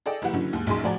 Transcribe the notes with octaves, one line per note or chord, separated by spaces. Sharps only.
G#4 A4 D5 D#5 G5
F#1 E3 G4 F#5
D3 E3 F#3 C#4
D#2 G#2
A#1 F#2 D#4 G#4 C6
A2 F3 F#4 D5 G#5 A#5